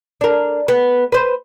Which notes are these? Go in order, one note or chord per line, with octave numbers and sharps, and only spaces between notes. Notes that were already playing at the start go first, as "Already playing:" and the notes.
D4 A#4
B3
B4 C5